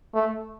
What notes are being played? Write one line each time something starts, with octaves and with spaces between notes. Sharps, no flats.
A3